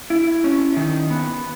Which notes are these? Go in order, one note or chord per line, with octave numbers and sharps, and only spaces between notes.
E4
C#4
D#3
B3